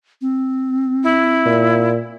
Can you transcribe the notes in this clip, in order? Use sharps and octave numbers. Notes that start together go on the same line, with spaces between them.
C4
E4
A#2